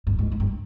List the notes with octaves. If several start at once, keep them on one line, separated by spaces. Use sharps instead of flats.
G2
G#2
G#2
G2